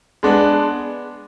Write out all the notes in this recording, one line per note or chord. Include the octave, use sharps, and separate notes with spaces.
G#3 B3 D4